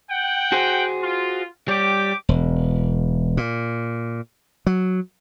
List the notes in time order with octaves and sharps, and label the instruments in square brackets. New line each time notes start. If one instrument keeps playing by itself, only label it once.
[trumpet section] F#5 G5
[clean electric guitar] F#4 G#4 C5
[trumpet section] F4
[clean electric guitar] G3 C#5 [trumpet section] G4 G5 D6
[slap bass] E1
A#2
F#3